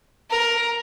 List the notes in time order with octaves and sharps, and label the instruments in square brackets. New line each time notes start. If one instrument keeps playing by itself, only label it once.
[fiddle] A#4